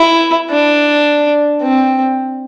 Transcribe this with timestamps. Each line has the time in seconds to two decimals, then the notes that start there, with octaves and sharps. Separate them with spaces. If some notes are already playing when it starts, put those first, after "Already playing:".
Already playing: E4
0.50 D4
1.62 C4